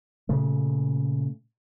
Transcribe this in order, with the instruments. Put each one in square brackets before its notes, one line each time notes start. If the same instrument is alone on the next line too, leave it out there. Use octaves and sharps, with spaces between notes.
[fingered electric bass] A#2 C#3 A3